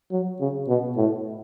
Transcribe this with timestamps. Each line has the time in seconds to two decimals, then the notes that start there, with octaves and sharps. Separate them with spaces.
0.12 F#3
0.41 C#3
0.68 B2
0.97 A2